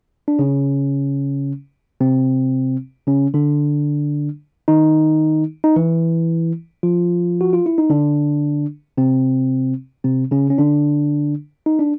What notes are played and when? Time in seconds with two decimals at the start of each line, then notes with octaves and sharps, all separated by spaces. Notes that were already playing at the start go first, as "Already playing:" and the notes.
0.28 D4
0.39 C#3 C#4
2.01 C3 C4
3.07 C#3 C#4
3.34 D3 D4
4.68 D#3 D#4
5.64 D#4
5.76 E3 E4
6.83 F3 F4
7.41 F#4
7.53 F4
7.66 E4
7.78 D#4
7.90 D3 D4
8.98 C3 C4
10.04 C3 C4
10.31 C#3 C#4
10.50 C#4
10.58 D3 D4
11.66 D#4
11.79 D4